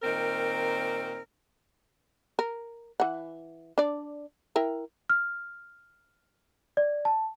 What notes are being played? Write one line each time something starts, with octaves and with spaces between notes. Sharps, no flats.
A#2 D#3 C4 A#4
A#4
E3 F#5
D4 D5
E4 A#4 G5
F6
D5
A5